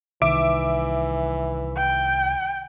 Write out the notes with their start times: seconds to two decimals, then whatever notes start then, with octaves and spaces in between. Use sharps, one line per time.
0.22 C2 D#3 E3 E5 D6 D7
1.77 G5